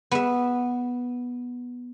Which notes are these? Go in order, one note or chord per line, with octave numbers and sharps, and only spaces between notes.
B3 E5